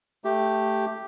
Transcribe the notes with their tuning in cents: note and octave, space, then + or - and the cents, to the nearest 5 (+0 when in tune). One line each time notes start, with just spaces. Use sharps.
A3 +0 G4 +0